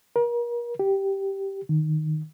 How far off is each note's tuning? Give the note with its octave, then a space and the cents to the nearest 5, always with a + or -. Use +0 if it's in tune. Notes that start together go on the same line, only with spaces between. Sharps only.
A#4 +35
G4 -5
D#3 -10